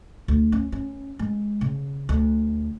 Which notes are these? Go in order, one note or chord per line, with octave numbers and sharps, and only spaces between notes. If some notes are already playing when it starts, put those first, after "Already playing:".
D2
C#4
C#4
G#3
C#3
D2